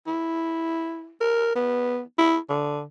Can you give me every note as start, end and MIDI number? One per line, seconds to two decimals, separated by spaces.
0.07 1.13 64
1.21 1.53 70
1.56 2.00 59
2.18 2.38 64
2.49 2.83 50